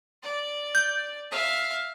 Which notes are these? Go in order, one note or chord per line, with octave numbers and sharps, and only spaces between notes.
D5
G6
E5 F5